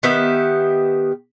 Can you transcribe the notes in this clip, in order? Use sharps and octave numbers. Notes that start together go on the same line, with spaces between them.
D#3 B3 G4 E5